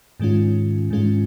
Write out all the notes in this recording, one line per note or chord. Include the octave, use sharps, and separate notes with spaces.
G#2 D#3 G#3 C#4 F4
G#2 D#3 G#3 C#4 F4